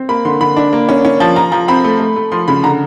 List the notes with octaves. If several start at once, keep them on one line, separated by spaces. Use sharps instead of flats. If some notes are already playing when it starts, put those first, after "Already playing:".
Already playing: C4
A#3 B5
D3 C6
D3 B5
D4
A#3
C#4
C#4
F3 A5
F3 A#5
F3 A#5
C4 B5
A3
A3
A3
F3 C6
C#3 B5
D3 A#5